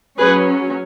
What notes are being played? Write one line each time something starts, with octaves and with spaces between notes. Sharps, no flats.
F#3 C#4 G#4 B4